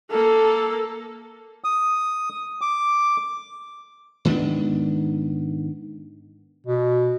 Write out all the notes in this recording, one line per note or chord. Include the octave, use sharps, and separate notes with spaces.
A#3 A4
D#6
D6
G#2 D#3 B3 D4
B2